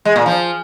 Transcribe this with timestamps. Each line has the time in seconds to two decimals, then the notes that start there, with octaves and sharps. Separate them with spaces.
0.05 G#3
0.16 A#2
0.26 F3